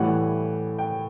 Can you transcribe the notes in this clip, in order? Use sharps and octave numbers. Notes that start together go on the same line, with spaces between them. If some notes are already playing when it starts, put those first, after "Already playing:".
Already playing: A2 E3 G3 F#5
G5